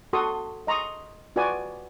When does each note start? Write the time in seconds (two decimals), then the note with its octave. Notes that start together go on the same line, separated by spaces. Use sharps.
0.13 F#4 A4 C6 C#6 D#6
0.67 D#5 A#5 C6 C#6 D#6
1.36 F4 F#4 B4 D5 G#5 D6